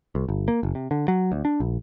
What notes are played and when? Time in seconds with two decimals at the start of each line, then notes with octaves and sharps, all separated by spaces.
0.15 C2
0.29 G1
0.48 A#3
0.63 F#1
0.75 C3
0.91 D3
1.08 F#3
1.32 D2
1.45 D4
1.60 A#1